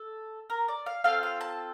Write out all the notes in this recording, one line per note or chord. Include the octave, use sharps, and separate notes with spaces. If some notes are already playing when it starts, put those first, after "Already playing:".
Already playing: A4
A#4
D5
F5
C4 F4 A4 F5
F5
A5